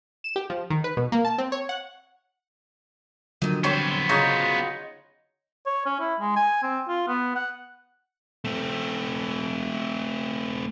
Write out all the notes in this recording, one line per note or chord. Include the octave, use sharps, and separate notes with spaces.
E7
G4
F3
D#3
B4
B2
A#3
A5
C4
C#5
F#5
A#2 D3 D#3 F3 F#3
G3 B3 C4 C5 C#5
C#3 D#4 F4 F#4 C#5 D#5 F#5 C6
C#5
C#4
E4
G#3
G#5
C4
F4
B3
F#5
A3 C4